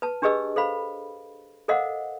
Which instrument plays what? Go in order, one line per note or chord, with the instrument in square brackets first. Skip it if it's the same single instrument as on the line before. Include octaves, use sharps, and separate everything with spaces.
[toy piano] B4 A5
D4 G4 G#4 B4 D#5 E6
A4 C5 F5 B5
A4 A#4 C5 D#5 F5 F#5